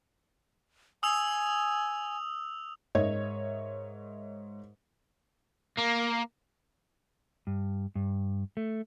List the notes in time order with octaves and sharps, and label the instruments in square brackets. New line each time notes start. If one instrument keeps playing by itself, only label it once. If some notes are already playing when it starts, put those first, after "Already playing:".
[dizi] G#5 [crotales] D#6 E6 F7
[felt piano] G#2 A#4 C#5 D#5 E5 G#6
[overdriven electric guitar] A#3
[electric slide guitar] G2
G2
A3